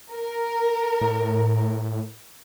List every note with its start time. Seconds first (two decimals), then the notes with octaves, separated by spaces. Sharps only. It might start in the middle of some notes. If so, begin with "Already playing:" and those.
0.12 A#4
1.01 A2